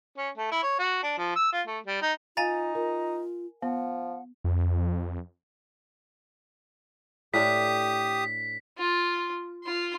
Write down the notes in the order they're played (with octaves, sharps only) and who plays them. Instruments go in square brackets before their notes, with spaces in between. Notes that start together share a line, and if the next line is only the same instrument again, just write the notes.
[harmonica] C#4
A3
E4
C#5
F#4
D4
F3
E6
F4
A3
G3
D#4
[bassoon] D#4 [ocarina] F4 [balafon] F5 [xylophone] G#5 A#5 A6
[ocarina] F4 [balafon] A#4
[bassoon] F3 [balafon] B3 [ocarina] F#5
[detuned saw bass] F2
[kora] A2 D4 A4 [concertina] G4 D#6 [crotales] B6
[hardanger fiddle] F4
F4 C6